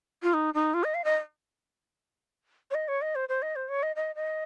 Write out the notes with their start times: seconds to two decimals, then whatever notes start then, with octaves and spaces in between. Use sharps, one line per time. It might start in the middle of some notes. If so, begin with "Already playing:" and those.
0.23 F4
0.34 D#4
0.54 D#4
0.74 F4
0.84 D#5
0.94 F5
1.04 D#5
2.71 C#5
2.75 D#5
2.88 C#5
3.02 D#5
3.15 C5
3.29 C5
3.42 D#5
3.56 C5
3.69 C#5
3.83 D#5
3.96 D#5
4.16 D#5